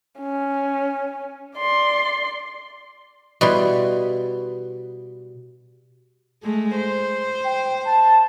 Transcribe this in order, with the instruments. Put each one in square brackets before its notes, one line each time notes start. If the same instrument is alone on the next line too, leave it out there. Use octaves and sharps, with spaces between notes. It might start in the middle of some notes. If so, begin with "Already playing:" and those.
[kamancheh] C#4
D5 C6
[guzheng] B2 G3 E4 C6
[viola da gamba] G#3 A3
C5
[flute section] G5
A5